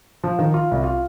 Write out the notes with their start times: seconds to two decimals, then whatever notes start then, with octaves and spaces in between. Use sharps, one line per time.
0.24 F3
0.39 D#3
0.54 F4
0.71 C2
0.84 F4